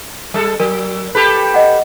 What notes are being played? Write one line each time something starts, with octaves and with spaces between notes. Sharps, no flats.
G3 A4
F#3 A#4
G4 A4 B4
D#5 F#5